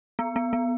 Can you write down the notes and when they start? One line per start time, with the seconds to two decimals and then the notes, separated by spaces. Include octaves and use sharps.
0.19 B3
0.36 B3
0.53 B3